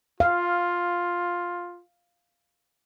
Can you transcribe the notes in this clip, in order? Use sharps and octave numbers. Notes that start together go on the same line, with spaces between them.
F4 F5